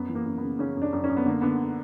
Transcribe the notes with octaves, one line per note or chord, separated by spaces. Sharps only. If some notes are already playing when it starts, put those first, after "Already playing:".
Already playing: F#2 B3
E3
A#3
F#2
C#3 B3
C#3 C#4
F#2
D4
F#2
C#4
F#2
B3
D3 A#3
D3 B3